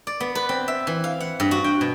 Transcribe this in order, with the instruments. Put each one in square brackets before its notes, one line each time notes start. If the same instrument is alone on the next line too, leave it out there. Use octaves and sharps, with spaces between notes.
[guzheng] D5
B3
B4
C4
E5
E3
F5
F#5
G2
F#4
G5
B2